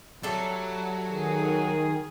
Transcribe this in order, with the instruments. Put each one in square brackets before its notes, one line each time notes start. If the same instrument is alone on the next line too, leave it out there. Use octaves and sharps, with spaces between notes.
[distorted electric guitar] F#3 [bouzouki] G3 A3 A4
[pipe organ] D#3 G#4